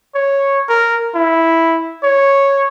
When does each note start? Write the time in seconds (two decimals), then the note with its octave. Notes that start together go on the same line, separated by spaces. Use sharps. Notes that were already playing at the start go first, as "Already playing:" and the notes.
0.15 C#5
0.69 A#4
1.15 E4
2.03 C#5